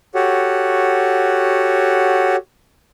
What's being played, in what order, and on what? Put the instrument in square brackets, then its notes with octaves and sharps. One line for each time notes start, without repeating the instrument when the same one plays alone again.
[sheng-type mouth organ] F#4 G4 A4 C#5 F#5